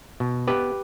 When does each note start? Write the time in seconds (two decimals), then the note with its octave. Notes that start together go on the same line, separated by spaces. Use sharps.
0.20 B2
0.48 B3 G4 B4